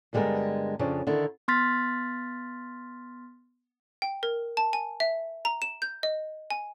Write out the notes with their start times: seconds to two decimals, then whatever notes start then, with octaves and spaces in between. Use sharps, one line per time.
0.13 G2 D3 G3 G#3 B3 A#4
0.79 F2 C#3 C#4 D4
1.07 D3 D#3 E4
1.48 B3 C6 F6 A6 B6
4.02 G5
4.23 A#4
4.57 A5
4.73 G#5
5.00 E5
5.45 A#5
5.62 E7
5.82 G6
6.03 D#5
6.50 G#5